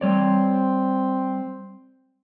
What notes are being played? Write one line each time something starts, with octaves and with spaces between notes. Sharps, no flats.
G3 C4 C#5 D5